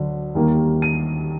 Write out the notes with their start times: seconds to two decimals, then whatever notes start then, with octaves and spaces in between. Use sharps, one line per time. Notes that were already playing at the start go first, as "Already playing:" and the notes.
Already playing: D2 D3 F#3
0.35 D#2 D#3 G3 A#3
0.82 D#7